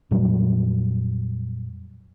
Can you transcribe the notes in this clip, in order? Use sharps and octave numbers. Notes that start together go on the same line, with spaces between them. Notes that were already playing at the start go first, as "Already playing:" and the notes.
F2 A#2 F#3 G3